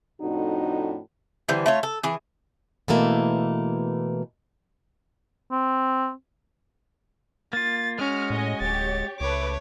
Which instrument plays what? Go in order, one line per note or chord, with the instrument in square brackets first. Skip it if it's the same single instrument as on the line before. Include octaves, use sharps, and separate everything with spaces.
[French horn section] F2 A2 D4 D#4 F#4
[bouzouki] D3 E3 G3 C5
A3 F4 C#5
A4
E3 G#4
[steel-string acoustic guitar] B2 E3 A3 A#3
[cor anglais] C4
[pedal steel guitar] A#3 F4 [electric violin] A6
[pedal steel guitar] G#3 F#4 [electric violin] C#4 [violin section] F6
[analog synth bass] A2 [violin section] C#5 D#5 G#5
[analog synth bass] D1 [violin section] G4 C#5 [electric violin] A6
[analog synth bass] C#2 [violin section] A3 B4 D6 [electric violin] C#5